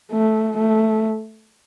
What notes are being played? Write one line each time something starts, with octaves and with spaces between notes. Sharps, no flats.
A3
A3